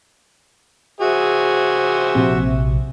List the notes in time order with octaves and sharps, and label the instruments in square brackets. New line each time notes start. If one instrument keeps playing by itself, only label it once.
[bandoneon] F#4 [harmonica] G#4 C5 E5
[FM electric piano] A#1 C3